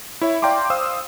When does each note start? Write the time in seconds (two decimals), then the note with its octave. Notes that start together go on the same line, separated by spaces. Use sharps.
0.21 E4 C#5 E5
0.42 D5 F5 G5 A#5 C6 D6
0.70 C5 F5 D#6 E6